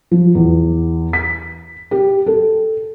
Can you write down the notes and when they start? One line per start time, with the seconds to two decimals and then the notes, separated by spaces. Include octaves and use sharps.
0.11 F3
0.35 E2
1.13 B6
1.91 G4
2.26 A4